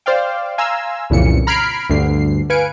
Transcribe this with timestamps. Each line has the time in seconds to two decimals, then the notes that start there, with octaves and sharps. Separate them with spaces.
0.06 C5 D5 F5 G5
0.58 F5 G#5 A#5 C6 E6
1.10 C2 F2 A#2 C#3 E3 C#7
1.47 A#5 B5 F6 G#6 C7 D7
1.90 D2 G2 D3 C7
2.50 B4 F5 G#5 C#7 D7